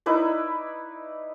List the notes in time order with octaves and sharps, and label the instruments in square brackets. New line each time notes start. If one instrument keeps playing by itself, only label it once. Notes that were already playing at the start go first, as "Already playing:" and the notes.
[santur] D#4 E4 B4 D5